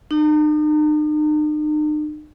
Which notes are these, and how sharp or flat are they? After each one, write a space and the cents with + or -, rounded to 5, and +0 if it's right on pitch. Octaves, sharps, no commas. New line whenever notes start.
D#4 -45